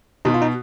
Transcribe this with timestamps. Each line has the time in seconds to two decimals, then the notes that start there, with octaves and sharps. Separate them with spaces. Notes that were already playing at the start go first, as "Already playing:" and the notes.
0.25 B2 D#4
0.34 F4
0.42 D#4